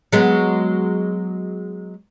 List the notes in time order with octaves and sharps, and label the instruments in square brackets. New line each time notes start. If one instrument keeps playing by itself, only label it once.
[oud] F#3 G#3 B3